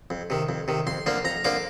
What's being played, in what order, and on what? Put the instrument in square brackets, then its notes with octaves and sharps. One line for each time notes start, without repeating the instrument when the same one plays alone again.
[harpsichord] F2
C3 D#3
F2
C3 D#3
F2 C6
D3 F3 A#3 F4
F2 A#5
D3 F3 A#3 F4 D6